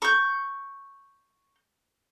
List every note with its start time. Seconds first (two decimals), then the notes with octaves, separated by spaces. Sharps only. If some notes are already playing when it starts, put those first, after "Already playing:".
0.02 C#6 G6